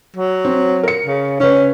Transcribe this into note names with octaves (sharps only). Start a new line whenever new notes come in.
F#3
C4
A#4 C#7
C#3
C#3 C#4 B4